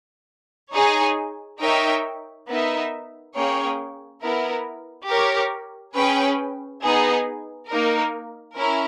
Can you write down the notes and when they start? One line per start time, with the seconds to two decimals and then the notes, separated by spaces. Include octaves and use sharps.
0.73 D#4 G#4 C#5 G#5
1.60 D#4 A#4 C#5 E5 G5
2.48 B3 D#4 A#4 E5
3.34 A#3 C#4 G#4 C#5 G5
4.21 B3 E4 A#4
5.08 G4 A#4 C#5
5.95 C#4 G#4 B4 G5
6.83 B3 D#4 G#4
7.69 A#3 D#4 A#4
8.56 C#4 E4 A#4